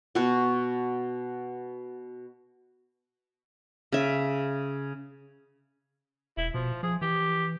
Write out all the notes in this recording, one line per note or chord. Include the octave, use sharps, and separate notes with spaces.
B2 F#4
C#3 E5
E1 E4
B2 F3
F3 G#4
E3 G4